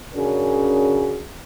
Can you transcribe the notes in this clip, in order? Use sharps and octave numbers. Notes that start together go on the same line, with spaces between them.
C#3 C#4 D4 F#4 G#4 A#4